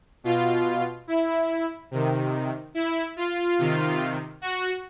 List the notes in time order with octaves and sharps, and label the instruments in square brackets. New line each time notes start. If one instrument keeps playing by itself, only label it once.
[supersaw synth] B2 F4
E4
C3 D#3
E4
F4
C3 D#3
F#4